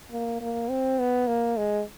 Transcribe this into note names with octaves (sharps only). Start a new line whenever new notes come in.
A#3
A#3
C4
B3
A#3
G#3